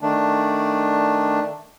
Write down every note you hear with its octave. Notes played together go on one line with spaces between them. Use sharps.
D#3 A3 D4